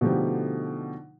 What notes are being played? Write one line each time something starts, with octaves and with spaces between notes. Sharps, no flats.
B2 D3 F3 A3 D#4 G4